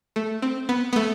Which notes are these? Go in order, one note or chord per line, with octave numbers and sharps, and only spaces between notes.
A3
C4
B3
B3
A3